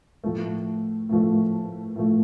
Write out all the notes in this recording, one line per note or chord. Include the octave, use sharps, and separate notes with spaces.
A2 F3 A3
A2 F3 A3
A2 F3 A3